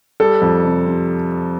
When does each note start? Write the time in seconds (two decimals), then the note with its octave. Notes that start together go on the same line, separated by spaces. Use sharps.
0.20 G3 A4
0.42 F2
0.65 C3
0.86 C3